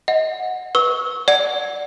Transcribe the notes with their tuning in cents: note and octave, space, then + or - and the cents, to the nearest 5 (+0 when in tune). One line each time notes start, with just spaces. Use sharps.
D#5 +25 F#5 -10
B4 +0 C#6 +0 E6 -30
D5 -10 F#5 +0